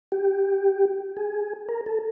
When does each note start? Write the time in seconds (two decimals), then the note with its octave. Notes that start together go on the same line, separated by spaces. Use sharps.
0.12 G4
1.17 G#4
1.69 A#4
1.86 A4